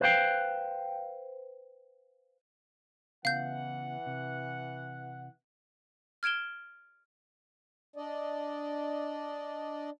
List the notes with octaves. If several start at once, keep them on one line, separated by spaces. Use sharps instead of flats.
B4 C5 F5 G5
C#3 E3 B3 F5 F#5 G6
C3
F6 G#6 D7 E7 G7
D4 D5 D#5